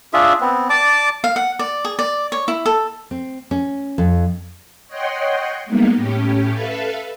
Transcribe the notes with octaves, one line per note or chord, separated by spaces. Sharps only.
D4 F4 G#4 E5
B3 C4
D5 A5 D6
F5
F#5
D5
G#4
D5
C#5
E4
A4
C4
C#4
F2
C#5 D#5 F#5 G5 C6
G3 G#3 A#3 B3 D#4
A2 C#4 G4
A4 B4 E5 F5